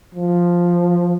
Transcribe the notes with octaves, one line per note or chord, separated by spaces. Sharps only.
F3